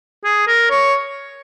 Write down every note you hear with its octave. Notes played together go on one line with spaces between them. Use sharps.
G#4
A#4
C#5